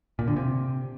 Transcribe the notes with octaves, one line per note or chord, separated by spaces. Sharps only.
A#2
D3
C3